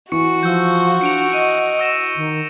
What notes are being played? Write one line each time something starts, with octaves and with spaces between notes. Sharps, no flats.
E3 F#4 C#6 C#7
F3 E6 G6
D4 C#7 D7 F7
D#5 D#7
E6 A#6 E7
D#3